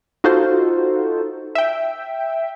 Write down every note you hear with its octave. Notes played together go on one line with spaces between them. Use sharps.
D#4 F4 F#4 A4 C5
E5 G5